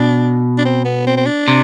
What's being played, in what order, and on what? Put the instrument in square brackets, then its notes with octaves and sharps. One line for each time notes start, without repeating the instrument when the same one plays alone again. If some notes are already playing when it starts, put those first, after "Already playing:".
Already playing: [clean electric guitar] B2 [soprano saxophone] D4
[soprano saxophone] D4
C4
B3
C4
C4
D4
[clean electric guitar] C3